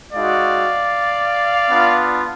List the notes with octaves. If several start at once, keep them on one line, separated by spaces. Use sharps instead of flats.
G#3 D#4 F#4 D5 F5
B3 D4 F4